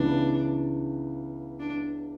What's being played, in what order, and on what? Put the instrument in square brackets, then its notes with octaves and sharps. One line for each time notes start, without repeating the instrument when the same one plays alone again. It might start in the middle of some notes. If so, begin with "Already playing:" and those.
Already playing: [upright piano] C#2 C#3 E3 B3 [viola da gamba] D4
[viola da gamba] D4